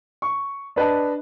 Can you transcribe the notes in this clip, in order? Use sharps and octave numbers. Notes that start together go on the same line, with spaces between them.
C#6
D4 B4 D#5 A5